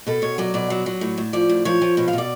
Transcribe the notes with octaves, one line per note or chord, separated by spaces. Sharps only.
B2 A4
B2 C#5
F#3 D5
B2 D5
F#3
F#3
A2
A2
F3 D5
A2
F3 C#5
F3
B2 C#5
F5
B2
D5